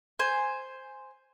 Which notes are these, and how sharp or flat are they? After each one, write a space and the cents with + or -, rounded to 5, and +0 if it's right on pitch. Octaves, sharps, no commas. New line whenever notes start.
C5 +0 G#5 +0